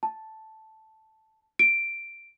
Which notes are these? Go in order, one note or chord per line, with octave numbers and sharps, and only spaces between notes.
A5
D7